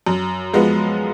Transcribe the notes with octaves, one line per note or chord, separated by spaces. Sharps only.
F#2
F3 G#3 B3